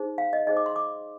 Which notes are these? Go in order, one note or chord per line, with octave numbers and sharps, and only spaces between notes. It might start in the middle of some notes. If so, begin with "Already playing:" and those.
Already playing: D#4 G#4 C5
F5
D#5
D#4 G#4 C5 D#5
D6
C6
D6